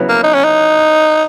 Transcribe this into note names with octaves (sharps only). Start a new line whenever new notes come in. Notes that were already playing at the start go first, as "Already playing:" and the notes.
Already playing: C#3 F#3 B3 E4 B4
A#3
D#4
C#4
D#4